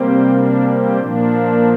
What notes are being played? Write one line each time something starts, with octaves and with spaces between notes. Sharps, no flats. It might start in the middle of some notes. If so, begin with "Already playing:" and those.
Already playing: C3 G3 A#3 C4
D4
C4
A#2 F3 A#3 D4